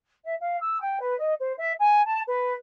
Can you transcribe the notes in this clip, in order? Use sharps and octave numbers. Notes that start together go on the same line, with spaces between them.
E5
F5
E6
G5
B4
D#5
C5
E5
G#5
A5
B4